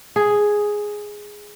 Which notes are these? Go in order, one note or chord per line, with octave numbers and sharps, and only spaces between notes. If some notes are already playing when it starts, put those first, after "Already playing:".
G#4